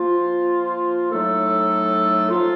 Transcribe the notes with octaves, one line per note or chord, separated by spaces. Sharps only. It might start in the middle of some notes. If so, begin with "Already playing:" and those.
Already playing: F3 A#3 F4
A2 F#3 A3 D#4 A4
F3 A#3 F4